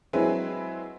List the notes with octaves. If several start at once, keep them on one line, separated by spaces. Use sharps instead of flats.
F#3 G#3 C4 E4 G#4 B4